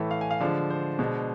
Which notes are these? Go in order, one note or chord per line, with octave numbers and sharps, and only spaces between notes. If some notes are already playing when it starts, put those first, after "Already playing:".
Already playing: A2 E3 A3
F5
G#5
F5
D3 F3 G#3 D5
C5
B2 G#3 D4